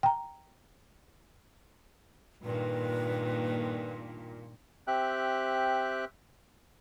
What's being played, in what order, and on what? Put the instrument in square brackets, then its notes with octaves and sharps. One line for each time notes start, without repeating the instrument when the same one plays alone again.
[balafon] G5 A#5
[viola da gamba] G2 D#3 [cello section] A#2 [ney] B4
[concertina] C4 G4 E5 G5 F#6